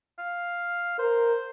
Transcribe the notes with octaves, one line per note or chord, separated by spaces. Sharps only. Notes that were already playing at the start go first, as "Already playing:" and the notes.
F5
A#4 C5